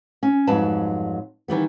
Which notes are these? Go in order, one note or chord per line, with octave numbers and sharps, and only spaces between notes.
C#4
F2 G#2 F#3 G3 B4 A5
D#3 E3 G3 B3